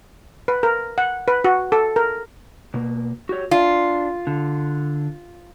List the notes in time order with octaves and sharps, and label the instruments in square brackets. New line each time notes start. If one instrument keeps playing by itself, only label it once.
[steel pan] B4
A#4
F#5
B4
F#4
A4
A#4
[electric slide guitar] B2 A#3
F#4 G4 C#5
[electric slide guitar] D4 [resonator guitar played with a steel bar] F4
[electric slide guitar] D3